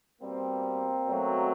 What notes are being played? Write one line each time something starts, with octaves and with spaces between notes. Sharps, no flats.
B2 G3 A#3 C4
B2 F#3 A3